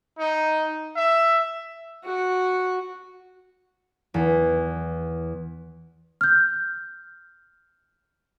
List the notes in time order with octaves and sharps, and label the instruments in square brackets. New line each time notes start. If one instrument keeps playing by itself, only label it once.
[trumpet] D#4
E5
[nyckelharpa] F#4
[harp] E2
[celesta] F6 G6